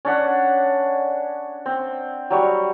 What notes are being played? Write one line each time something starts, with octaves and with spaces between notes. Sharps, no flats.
C#4 D4 F#5
C4
F#3 G3 C#6